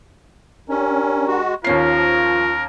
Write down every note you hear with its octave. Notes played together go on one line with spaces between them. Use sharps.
C#4 D4 G4 A#4
G#3 F#4
D#2 F3 C#4 F4 A#4 C7